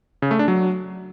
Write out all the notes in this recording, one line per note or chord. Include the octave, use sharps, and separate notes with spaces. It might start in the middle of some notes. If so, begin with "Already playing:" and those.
C#3
A3
D4
F#3